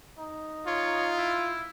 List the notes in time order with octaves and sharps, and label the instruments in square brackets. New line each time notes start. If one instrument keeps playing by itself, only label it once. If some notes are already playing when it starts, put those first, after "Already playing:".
[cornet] D#4
[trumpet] F4 [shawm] C#5
[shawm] E4